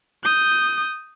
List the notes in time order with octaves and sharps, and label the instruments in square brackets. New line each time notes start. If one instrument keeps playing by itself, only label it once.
[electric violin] D#6 G6